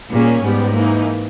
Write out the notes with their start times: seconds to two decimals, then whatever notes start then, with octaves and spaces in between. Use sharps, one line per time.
0.10 A#2 G3 A#3 C#4 G#4
0.42 G#2 G3 B3 G4
0.75 E3 A#3 D#4